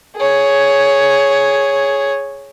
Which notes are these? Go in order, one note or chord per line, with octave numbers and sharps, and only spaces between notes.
G#4 C#5